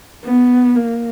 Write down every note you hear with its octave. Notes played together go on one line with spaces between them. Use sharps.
B3
A#3